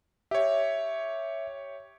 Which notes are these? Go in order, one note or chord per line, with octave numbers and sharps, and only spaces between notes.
G4 C#5 E5